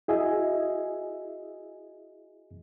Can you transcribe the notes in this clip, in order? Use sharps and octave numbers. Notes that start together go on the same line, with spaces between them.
E4 F#4 G#4 D#5 E5 G#5